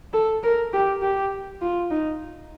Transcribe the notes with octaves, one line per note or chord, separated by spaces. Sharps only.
A4
A#4
G4
G4
F4
D#4